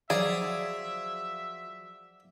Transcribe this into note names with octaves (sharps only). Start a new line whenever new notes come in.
F3 F#3 G#4 D5 E5 F5